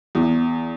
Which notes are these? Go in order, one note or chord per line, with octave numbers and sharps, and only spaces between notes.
E2